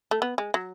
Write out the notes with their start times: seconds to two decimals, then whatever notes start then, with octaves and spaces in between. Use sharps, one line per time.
0.11 A3
0.22 B3
0.38 G#3
0.54 F#3